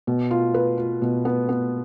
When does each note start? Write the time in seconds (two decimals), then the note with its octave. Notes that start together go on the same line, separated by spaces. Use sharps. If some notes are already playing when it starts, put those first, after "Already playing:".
0.07 B2
0.31 F4
0.54 B4
0.78 F4
1.02 B2
1.25 B3
1.49 B3